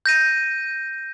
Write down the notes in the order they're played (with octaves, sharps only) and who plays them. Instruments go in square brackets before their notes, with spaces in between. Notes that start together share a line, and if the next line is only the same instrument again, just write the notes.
[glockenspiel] G6 A#6 D#7